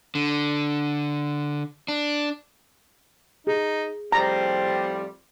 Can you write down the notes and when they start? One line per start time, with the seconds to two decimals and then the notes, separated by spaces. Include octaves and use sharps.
0.15 D3
1.88 D4
3.47 D#4 G#4
4.12 A2 F3 G3 C4 A#5